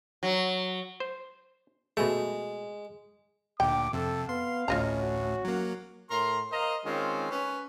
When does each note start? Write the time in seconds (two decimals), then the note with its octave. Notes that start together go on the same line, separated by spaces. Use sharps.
0.23 F#3
1.00 C5
1.97 B2 G#3 A3
3.60 D2 A#2 D3 G5 D6
3.93 F2 C3 A4
4.29 B3 F5 C6
4.68 A1 D2 A2 C#4 F4 D#5 A#5
5.01 F#4
5.45 F#3 A#3
6.10 A2 A#4 C6
6.52 A#4 C5 D#5 F5 A#5
6.85 D#3 G#3 C4 C#4 F4
7.30 C#4 B4